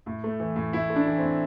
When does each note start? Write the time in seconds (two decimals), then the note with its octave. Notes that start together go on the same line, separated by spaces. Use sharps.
0.06 A2
0.24 A3
0.40 E3
0.56 A2
0.73 A2 E4
0.90 A3
0.96 D4
1.07 E3
1.18 A2 C4